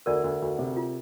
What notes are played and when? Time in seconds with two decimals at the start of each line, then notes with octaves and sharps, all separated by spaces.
0.06 D2 A#4 D5
0.24 D2
0.42 D2
0.59 C3
0.77 F4